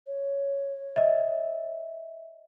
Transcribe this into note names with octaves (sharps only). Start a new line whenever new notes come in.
C#5
D#5 E5